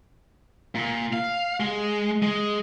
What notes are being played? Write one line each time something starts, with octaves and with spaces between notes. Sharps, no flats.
A#2
F5
G#3
G#3